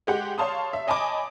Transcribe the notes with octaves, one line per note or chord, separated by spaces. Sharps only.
G#3 G4 F#5
C#5 F5 A5 C6 D#6
E5
C#5 D#5 G#5 A5 B5 D6